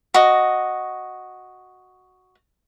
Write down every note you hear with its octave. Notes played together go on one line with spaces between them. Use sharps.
F#4 D#5